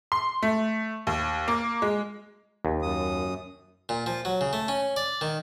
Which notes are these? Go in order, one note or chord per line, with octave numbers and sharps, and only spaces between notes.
C6
A3
D#2
A#3
G#3
D#2
F#2 D#6
A#2
F3
F#3
C#3
A3
C#4
D5
D#3